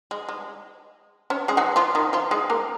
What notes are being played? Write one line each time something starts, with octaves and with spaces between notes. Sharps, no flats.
G#3
G#3
C#4 C#5
G#3 G#4
F#3 F#4
F3 F4
D#3 D#4
F3 F4
G#3 G#4
A#3 A#4